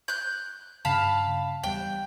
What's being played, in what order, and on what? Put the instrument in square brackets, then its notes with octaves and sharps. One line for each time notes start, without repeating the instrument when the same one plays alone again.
[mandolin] F#6 G6
[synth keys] G2 C#3 [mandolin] F5 A5 B5
[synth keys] E2 G3 F#6 [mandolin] G5